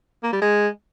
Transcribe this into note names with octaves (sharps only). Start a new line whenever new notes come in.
A#3
G3
G#3